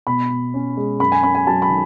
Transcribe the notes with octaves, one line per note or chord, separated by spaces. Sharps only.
B2 B5
B2
C#4
G#3
F#2 B5
G#5
C#4 B5
G#5
F#3 A5
B5
D#3